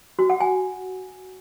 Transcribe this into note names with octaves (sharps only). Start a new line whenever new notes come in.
F#4
F#5
G#5